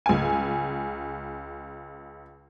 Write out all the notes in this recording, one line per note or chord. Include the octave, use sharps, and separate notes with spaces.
C#2 G#5